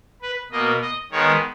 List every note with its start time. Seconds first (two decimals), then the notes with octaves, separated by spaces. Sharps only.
0.22 B4
0.51 B2 A#3 D#5
0.82 D#5
1.12 D#3 G#3 B3 C#5